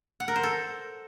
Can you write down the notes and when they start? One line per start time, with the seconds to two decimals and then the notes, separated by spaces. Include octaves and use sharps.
0.20 F#5
0.28 A#4
0.36 C5
0.43 A4